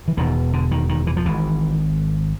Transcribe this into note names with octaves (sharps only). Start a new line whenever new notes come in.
E3
E1 E2 B2 D#3
D3
D#3
D#3
E3
F3
G#1 G#2 E3